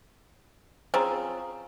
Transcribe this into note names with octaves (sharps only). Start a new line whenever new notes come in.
F3 C4 C#4 G#4 A#5